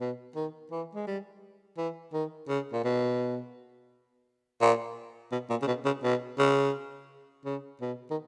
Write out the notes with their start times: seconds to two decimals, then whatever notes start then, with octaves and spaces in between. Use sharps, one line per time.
0.01 B2
0.36 D#3
0.71 E3
0.95 G#3
1.07 G3
1.77 E3
2.14 D#3
2.49 C#3
2.73 A#2
2.84 B2
4.62 A#2
5.32 B2
5.50 A#2
5.62 C#3
5.67 B2
5.85 C#3
6.03 B2
6.38 C#3
7.45 C#3
7.81 B2
8.11 D#3